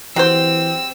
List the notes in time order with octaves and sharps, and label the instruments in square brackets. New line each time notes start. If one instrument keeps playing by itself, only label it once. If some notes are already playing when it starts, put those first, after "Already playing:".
[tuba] E3 [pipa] F#3 C5 [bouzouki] C4 G4 [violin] E6